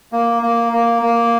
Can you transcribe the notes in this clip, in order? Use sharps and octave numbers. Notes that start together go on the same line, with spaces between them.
A#3
A#3
A#3
A#3